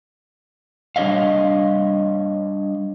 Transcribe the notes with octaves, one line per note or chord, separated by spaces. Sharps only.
G3 D4 C#5 D#5 F5